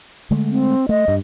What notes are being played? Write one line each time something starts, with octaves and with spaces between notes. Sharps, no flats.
D3 G#3 A3
C4
A3 D#5
G2